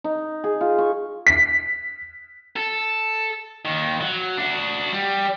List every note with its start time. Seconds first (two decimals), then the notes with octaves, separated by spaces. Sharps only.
0.04 D#4
0.44 G#4
0.61 F4
0.78 C#6
1.27 B6
2.56 A4
3.65 D#2 D#3
4.01 F#3
4.37 D4 F#4
4.92 G3